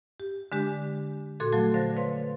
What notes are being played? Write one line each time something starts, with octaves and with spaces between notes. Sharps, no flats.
G4
D3 G#3 D4 G4
A#2 F#4 A4 C6 G#6
F3 F#3 A3 F#4
D3 C5 F5 A6 A#6
B4 C#5 F5 C6